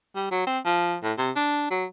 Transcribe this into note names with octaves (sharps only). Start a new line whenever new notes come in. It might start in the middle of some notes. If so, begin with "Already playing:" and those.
G3
F#3
C4
F3
A2
C3
D4
F#3